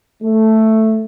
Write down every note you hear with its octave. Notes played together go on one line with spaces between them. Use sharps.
A3